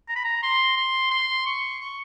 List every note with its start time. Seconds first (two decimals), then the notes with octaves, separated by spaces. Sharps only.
0.09 A#5
0.16 B5
0.24 A#5
0.43 C6
0.77 C6
1.11 C6
1.46 C#6
1.81 C#6